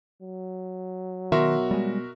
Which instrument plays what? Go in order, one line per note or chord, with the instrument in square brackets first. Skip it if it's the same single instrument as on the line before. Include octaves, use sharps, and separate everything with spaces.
[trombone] F#3
[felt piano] B2 C6 [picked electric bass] D#3 [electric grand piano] F#4 A#4 E5
[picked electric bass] G3 G#3